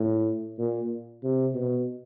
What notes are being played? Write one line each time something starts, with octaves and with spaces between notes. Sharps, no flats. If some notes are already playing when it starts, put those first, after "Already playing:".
Already playing: A2
A#2
C3
B2